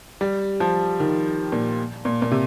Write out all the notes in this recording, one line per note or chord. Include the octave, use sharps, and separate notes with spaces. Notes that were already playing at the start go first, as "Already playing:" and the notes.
G3
F3
D#3
A#2
A#2
A#2
C3